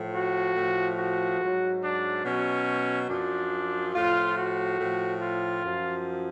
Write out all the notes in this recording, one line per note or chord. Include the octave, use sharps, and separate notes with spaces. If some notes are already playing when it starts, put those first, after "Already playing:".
Already playing: A2 F3
F#4
A2 F3
F#4
G#2 F#3
D4
B2 F#3 C#4
F#2 F3 D4
A2 F3 F4
F#4
A2 F3
F4
F#2 F3